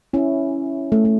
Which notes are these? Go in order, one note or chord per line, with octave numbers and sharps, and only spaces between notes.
C#4 E4
A3
A3